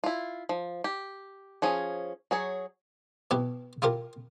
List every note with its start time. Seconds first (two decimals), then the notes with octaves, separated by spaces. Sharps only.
0.04 E4 F4
0.49 F3
0.84 G4
1.62 F3 C#4 G#4
2.31 F#3 G#4 C#5
3.31 B2 E4 F#4 G4
3.82 E4 F4 G4 A#4